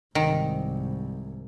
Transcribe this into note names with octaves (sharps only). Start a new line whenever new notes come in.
C2 G#2 D#3